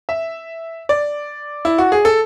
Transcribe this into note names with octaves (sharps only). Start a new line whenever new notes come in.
E5
D5
E4
F#4
G#4
A4